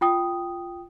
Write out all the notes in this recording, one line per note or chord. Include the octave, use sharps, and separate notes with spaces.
F4 G5 D#6